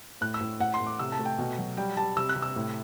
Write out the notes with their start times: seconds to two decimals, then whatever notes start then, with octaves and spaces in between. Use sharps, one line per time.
0.21 A2 F#6
0.34 E6
0.41 A2
0.60 A2 F#5
0.74 C6
0.80 A2
0.87 D6
0.99 C3 E6
1.12 A5
1.19 A3
1.25 G5
1.38 B2
1.58 F#3
1.77 G3 G5
1.97 G3 A5
2.17 C3 E6
2.29 F#6
2.36 C3
2.42 E6
2.56 A2